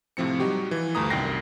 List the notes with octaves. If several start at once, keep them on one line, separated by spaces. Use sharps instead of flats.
A2 C3 F3 C4 C#7
F#3 G3 D#4 F#4 G4
E3 F3
D2 G2 A3 A#5 D#6
C2 F#2 D#3 G5 A#6 C7